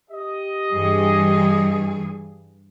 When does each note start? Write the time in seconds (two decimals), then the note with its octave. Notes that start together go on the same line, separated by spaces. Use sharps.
0.11 G4 D#5
0.73 G2 E3 G#4